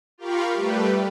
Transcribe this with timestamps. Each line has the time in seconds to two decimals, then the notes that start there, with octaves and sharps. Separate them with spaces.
0.18 F4 G4 A#4 F5 B5 C#6
0.54 G3 A3 G4 B4